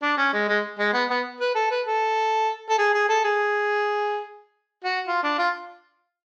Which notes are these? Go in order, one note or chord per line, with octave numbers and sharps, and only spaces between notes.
D4
C#4
G#3
G#3
G#3
B3
B3
B4
A4
B4
A4
A4
G#4
G#4
A4
G#4
F#4
F4
D4
F4